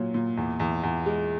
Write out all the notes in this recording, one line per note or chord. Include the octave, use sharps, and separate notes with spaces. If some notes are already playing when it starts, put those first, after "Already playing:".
Already playing: A#2 F#3
A#2
E2
E2
E2
G#3